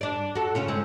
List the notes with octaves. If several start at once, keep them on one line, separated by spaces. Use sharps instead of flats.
D4 D5
F#4 A4
C#3 C#4 F4
G#3 C4